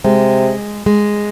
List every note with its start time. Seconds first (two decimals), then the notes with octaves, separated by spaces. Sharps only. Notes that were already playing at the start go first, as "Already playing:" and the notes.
0.04 C3 G#3
0.86 G#3